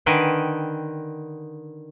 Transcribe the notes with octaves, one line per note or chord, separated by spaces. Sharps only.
D3 D#3 B4 G5 G#5